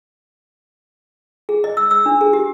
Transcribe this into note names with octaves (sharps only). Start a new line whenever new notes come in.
G#4
D#5
E6
E6
D4
G#4
G4